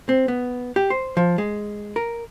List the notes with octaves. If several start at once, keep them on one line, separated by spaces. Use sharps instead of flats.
C4
B3
G4
C5
F3
G#3
A#4